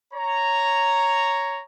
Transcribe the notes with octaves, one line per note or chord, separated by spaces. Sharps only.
C#5 A#5